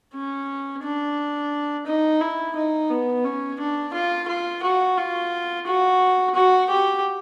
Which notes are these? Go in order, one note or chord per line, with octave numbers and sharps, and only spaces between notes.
C#4
D4
D#4
E4
D#4
B3
C#4
D4
F4
F4
F#4
F4
F#4
F#4
G4